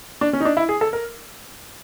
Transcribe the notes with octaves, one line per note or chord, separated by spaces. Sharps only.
D4
C#4
D#4
D4
E4
G#4
A4
A#4